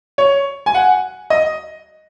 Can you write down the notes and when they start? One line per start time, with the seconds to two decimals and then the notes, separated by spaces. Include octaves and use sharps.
0.18 C#5
0.66 G#5
0.75 F#5
1.30 D#5